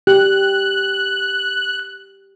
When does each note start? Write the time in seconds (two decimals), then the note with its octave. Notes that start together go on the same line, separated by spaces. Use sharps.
0.07 G4 F#6